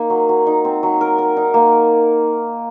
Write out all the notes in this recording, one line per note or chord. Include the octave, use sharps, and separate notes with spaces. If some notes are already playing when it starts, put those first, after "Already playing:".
Already playing: A#3 D#4
F#3
F#3
D#4
C4
F#3
A#4
A#4
D#4
A#3